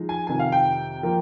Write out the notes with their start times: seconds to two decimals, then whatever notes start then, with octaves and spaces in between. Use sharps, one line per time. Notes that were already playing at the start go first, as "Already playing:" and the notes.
Already playing: F3 G#3 D#4
0.09 G#5
0.27 F2 C3 D#3 G#5
0.40 F5
0.52 G5
1.03 F3 A#3